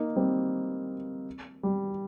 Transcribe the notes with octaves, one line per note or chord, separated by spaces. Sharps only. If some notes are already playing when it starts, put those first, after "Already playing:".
Already playing: A#3 D#4
G3 C4
G3